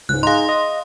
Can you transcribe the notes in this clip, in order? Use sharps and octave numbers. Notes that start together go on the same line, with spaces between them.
C#2 G#2 F#6
D#4 G#4 F5 C6
D#5